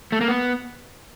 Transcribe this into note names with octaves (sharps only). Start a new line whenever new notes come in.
A3
A#3
B3